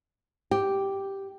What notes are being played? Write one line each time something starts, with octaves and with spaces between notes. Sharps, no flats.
G4